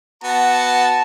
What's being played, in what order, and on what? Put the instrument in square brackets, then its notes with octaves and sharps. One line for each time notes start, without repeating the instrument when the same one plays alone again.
[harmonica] B3 F#4 [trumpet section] A5